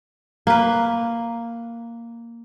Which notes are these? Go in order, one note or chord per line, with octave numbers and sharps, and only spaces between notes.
A#3 B4